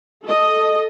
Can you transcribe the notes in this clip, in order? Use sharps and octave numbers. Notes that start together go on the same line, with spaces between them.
A4 D#5